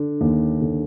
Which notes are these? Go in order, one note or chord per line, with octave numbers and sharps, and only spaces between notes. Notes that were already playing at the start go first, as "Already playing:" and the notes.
Already playing: D3
D#2
D3